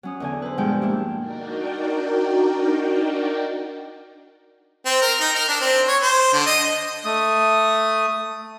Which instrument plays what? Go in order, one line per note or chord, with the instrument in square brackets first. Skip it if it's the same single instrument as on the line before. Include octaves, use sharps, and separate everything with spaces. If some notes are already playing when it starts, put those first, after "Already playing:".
[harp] F#3 C#4 D#6
E2 D3 G#5
B4 C5
G2 B2 F3 G#3 G5
A#3 D4 E4 G4
[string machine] D4 D#4 F#4 A#4 D5 G5
[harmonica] C4
A#4
D#4
A#4
D4
C4
C#5
C5
D3
D#5
[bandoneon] A3 D#6